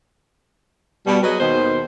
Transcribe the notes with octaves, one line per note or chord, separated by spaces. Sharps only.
B2 G3
F#3 F#4 G#4 B4 D#5
D#2 B2 D#3 C5